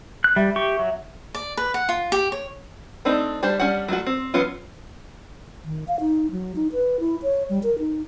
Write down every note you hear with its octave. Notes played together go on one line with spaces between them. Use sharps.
F#6
G3 E5
G4 C#6
F#3
D5
B4
F#5
F4
G4
C#5
A3 C4 D4 D#4
G3 D4 G4 C5
G3 C#4 D4 G4 F#5
F#3 A3 F4 F#4
C4
E3 F#3 B3 C#4 F4
D#3
F5
D#4
F#3
D#4
B4
E4
C#5
G3
A#4
D#4